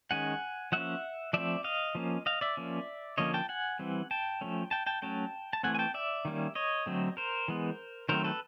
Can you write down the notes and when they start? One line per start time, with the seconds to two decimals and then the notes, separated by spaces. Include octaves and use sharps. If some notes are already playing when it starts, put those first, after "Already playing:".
0.11 D#3 G#3 C#4 F#5 G#5
0.72 F3 A#3 C#4 E5 F#5
1.33 F3 A3 C4 D5 E5
1.64 D#5 F5
1.95 F3 A#3 C#4
2.26 D#5 F5
2.41 D5 E5
2.57 F3 A#3 C#4
3.18 D3 F3 A#3 C#4 C#5 D#5
3.34 G5 A5
3.49 F#5 G#5
3.79 E3 G3 C4
4.11 G5 A5
4.41 F3 A3 C#4
4.71 G5 A5
4.87 G5 A5
5.02 F#3 A3 C#4 G5 A5
5.53 A5
5.63 E3 A3 C4 F#5 G#5
5.75 G#5
5.79 G5 A5
5.94 D5 E5
6.25 D#3 G3 A#3 C#4
6.55 C#5 D#5
6.86 D3 F#3 A3 C4
7.17 A#4 C5
7.48 E3 G#3 B3
8.09 D#3 F#3 A3 C4 A#4 C5
8.24 A4 B4